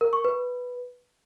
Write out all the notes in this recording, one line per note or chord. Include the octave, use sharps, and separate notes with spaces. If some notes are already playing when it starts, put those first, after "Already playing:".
A#4
C#6
B4